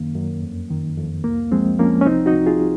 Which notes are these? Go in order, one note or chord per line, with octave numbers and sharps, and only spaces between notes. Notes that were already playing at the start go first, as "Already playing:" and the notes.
Already playing: F#2 D#3 A#3
F#2
F2
D#3
F2
C2 A#3
F3 G#3 C4
F3 A#3 C#4
C#4
C2 C4 D#4
D#4 F#4
C2
F4 G#4